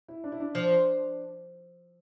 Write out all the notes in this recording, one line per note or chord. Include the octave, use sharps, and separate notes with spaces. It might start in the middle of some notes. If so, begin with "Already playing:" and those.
E4
D4
E4
D4
F3